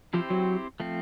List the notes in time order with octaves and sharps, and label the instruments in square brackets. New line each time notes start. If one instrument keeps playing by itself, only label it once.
[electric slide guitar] F3 [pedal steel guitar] C4 E4 G4 C5
[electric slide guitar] F#3
[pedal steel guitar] F3 A3 C4